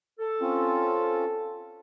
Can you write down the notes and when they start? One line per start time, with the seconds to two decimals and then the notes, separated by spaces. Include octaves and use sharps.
0.19 A4
0.41 C4 C#4 F4